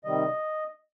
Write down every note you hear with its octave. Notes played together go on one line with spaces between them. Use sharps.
C3 D#3 G3 D#5